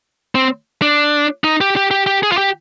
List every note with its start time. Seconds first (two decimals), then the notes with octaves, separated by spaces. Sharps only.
0.35 C4
0.82 D4
1.44 D#4
1.61 G4
1.76 G4
1.91 G4
2.06 G4
2.23 G#4
2.32 F4
2.38 G4